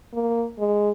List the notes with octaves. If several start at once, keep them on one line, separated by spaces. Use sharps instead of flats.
A#3
G#3